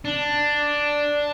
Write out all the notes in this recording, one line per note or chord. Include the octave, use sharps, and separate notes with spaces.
D4